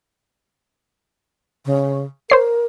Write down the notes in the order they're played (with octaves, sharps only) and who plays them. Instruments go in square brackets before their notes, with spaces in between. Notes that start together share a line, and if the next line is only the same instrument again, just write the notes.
[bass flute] C#3
[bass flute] A#4 [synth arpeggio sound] C5 C#5 C7